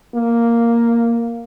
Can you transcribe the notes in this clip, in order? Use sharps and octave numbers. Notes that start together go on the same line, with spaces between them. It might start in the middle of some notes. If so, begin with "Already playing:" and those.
A#3